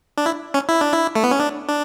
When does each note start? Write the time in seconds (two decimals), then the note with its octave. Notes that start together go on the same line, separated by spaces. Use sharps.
0.18 D4
0.26 E4
0.54 C#4
0.69 E4
0.81 D4
0.93 E4
1.15 A3
1.24 B3
1.31 C#4
1.40 D4
1.69 D4